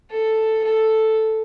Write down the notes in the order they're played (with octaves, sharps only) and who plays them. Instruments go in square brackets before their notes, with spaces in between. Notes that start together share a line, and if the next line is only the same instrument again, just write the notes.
[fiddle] A4
A4